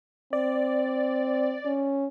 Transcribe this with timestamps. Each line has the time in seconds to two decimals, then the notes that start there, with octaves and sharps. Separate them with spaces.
0.33 C4 D5
1.66 C#4